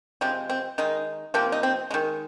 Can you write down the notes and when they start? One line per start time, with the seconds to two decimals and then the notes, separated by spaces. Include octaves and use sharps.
0.21 C3 F3 G#3 C4
0.50 C4
0.78 D#3 G#3 D#4
1.34 C3 F3 A#3 C4
1.52 D#4
1.63 C4
1.91 D#3 G#3